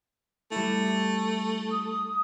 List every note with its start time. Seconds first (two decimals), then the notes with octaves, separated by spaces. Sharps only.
0.52 G3 A3 E4
1.71 D#6